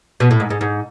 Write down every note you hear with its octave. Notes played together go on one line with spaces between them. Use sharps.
B2
A2
G#2
G#2
G#2